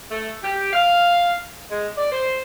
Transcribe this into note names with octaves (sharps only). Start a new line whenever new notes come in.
A3
G4
F5
G#3
D5
C5